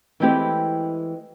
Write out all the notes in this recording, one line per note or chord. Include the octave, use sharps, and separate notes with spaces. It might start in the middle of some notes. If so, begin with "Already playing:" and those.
E3 G#3 A3 C4 E4 G4